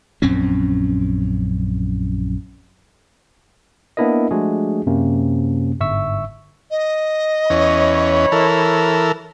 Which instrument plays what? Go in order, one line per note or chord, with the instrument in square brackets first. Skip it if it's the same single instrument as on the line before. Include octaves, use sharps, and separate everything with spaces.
[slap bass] A#1 F#2 C4 C#4
[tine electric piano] A#3 B3 D4 E4 A#4 D#5
F3 G#3 A3 D4 F#4 G#4
F#2 C3 A#3 C#4
G1 G#2 E5 C#6 E6
[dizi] D#5
[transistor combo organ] E2 C#4 [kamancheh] C#5 B5
[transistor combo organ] E3 A4 A#4